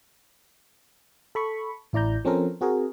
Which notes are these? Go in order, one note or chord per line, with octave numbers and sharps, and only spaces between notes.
A4 B5 C#6
A1 E4 D5 A#5 G6
F3 C4 C#4 A4 A#4 C5
C4 F#4 G#4 A#4